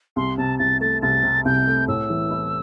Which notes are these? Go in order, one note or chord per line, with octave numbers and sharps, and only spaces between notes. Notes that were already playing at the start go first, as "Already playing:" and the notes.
C2 C6
C3 A5
C2 A6
A3 A6
C2 A6
C3
C2 G6
A3
A2 E6
E3
E4